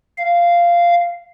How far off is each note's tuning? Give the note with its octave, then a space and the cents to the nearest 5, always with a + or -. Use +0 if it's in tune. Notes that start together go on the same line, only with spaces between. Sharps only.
F5 -10